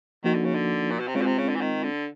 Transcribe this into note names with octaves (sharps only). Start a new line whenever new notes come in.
D#3 F3 A#3 D#4 F#4
D3
C#3
D3
A#2
B2
C3
C#3 G#3 C4 F4
B2
C3
C#3
D3
E3
D#3
D3